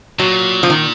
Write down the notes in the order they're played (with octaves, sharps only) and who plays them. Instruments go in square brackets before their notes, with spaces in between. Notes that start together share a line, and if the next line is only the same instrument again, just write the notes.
[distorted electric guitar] A#2 [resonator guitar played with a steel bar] F#3
[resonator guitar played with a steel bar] F3
D#3